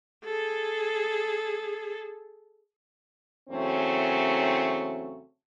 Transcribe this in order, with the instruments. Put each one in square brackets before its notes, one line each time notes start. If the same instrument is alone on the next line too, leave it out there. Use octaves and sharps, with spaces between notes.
[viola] G#4 A4
[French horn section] E2 C#3 F#3 A3 C4 C#4